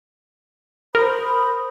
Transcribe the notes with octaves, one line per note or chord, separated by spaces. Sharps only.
A#4 C5 B5 D#6